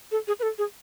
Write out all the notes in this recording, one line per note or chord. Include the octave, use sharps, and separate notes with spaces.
A4
G#4
B4
A4
G#4